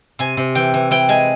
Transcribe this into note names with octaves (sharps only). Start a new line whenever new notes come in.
C3 G#5
C3
E3 G5
E3
E3 G5
G#3 G#5